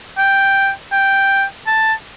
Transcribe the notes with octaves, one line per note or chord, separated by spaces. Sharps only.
G5
G5
A5